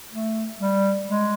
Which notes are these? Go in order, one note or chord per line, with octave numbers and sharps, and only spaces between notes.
A3
G3
G#3